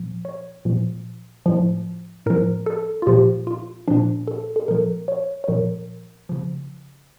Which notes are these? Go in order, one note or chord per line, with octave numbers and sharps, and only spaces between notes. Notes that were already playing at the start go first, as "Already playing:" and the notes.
Already playing: A#2 F3
C#5
A#2 F3
A2 F3
A2 F3 A#4
A4
F4
A#2 F3 G4
F4
A#2 F3 D4
A4
A4
A#2 F3 A#4
C#5
C#5
A#2 F3 A#4
C#3 F3